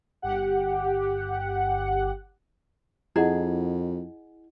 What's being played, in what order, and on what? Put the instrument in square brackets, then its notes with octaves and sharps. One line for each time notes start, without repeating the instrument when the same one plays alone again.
[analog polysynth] G1 G4 F#5
[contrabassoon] F2 [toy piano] E4 D#5 F#5 [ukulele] G#4